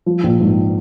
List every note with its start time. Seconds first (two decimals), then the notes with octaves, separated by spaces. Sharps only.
0.06 F3
0.23 A#1
0.41 G#2